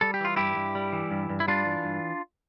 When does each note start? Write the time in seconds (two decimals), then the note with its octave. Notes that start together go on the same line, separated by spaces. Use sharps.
0.01 G3 A4
0.14 G4
0.20 E3 F4
0.36 G2 E4 G4
0.56 G2
0.75 G3
0.92 E3
1.11 G2
1.30 G2
1.40 E4
1.48 G3 D4 F4
1.66 E3
1.84 G2